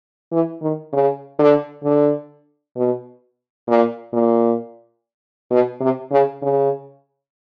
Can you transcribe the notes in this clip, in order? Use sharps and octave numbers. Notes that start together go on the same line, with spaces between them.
E3
D#3
C#3
D3
D3
B2
A#2
A#2
B2
C3
C#3
C#3